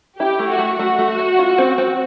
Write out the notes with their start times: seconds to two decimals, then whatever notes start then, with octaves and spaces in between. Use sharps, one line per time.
0.19 E4 G4
0.39 A3
0.49 F#4
0.59 A3
0.79 A3 F#4
0.98 A3
1.19 A3
1.39 F4
1.58 C4
1.78 C4